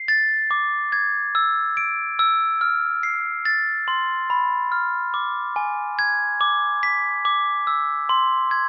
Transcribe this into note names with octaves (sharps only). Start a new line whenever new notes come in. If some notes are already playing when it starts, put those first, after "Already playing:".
Already playing: C7
A6
D6
G#6
E6
D7
E6
F6
C7
A6
C6
B5
F6
D6
G#5
G#6
D6
B6
D6
E6
C6
G#6